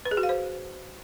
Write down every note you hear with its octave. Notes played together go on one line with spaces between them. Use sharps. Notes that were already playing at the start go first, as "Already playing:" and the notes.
B4
G#4
F#4
F5
C5